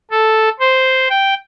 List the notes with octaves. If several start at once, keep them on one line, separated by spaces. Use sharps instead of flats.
A4
C5
G5